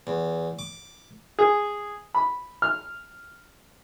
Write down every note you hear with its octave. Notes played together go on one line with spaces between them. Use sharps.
E2
D6
G#4
B5
F6